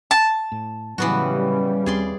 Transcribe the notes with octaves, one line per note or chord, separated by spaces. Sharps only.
A5
A2
A2 C#3 E3 F#3 G3 B3 F#4
D#2 C4 G#4 D5 C6